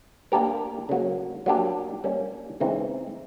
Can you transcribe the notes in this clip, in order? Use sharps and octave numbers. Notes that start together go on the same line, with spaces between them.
A#3 D4 G4 A#4
C#3 F#3 A#3
F#3 A#3 D4 G4
G3 A#3 C#4
C#3 E3 G#3 C4 D#4